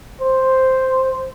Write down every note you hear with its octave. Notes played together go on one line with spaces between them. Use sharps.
C5